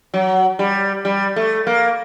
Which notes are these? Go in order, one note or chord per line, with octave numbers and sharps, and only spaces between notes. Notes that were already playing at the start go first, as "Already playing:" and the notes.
F#3
G3
G3
A3
A#3